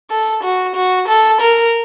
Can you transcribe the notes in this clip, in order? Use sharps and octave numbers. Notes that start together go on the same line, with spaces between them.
A4
F#4
F#4
A4
A#4